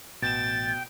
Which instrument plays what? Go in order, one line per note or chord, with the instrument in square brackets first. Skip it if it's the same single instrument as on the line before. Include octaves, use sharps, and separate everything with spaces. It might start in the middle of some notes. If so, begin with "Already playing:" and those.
[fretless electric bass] A1 [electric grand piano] B2 E7 [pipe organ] G5 [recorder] A6